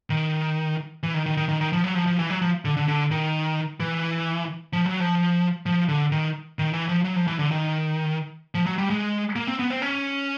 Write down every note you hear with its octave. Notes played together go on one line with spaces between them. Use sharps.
D#3
E3
D#3
D#3
D#3
D#3
D#3
F3
F#3
F3
F3
E3
F#3
F3
D3
D3
D3
D#3
E3
F3
F#3
F3
F3
D3
D#3
D#3
E3
F3
F#3
F3
E3
D3
D#3
F3
F#3
G3
G#3
A#3
C4
B3
C4
C#4